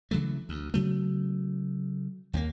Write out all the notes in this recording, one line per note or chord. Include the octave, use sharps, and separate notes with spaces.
C#3 E3 F#3 A3
D2
C#3 F#3 A3
D#2 A3 A#3